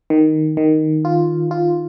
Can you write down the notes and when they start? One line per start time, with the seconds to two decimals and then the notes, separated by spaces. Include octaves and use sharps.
0.10 D#3
0.57 D#3
1.05 F4
1.51 F4